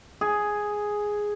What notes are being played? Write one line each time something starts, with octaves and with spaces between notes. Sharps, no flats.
G#4